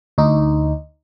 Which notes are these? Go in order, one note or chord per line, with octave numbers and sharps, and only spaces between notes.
D2 D#4